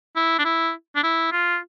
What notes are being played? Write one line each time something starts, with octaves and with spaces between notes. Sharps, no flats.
E4
D4
E4
D4
E4
F4